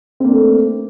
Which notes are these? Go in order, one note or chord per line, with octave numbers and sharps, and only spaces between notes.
A3 A#3 C4 D4